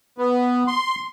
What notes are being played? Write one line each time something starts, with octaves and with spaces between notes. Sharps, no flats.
B3
C6